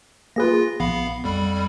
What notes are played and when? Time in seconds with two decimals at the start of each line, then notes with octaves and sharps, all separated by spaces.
0.36 A#3 F4 G#4 B4 A#6
0.80 A#1 B3 F5 B5
1.24 F2 G3 B5